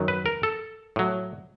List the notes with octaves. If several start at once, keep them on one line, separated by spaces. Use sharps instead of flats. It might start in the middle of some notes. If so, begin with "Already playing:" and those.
Already playing: F#2 D#3 F#3
B4
A#4
A4
A2 F#3